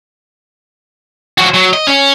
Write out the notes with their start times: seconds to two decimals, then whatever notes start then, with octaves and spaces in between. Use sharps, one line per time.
1.38 F3 F#4
1.54 F#3
1.73 D#5
1.87 C#4